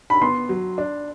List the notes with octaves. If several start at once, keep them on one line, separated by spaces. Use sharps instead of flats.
B5
B3 C6
F#3
D4